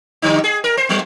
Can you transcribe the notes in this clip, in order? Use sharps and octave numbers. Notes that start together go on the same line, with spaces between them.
D3 G3 D#4
G#4
A#4
C5
F#3 B3